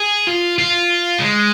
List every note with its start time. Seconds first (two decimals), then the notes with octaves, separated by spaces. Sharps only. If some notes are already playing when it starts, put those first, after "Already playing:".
Already playing: G#4
0.27 F4
0.58 F4
1.19 G#3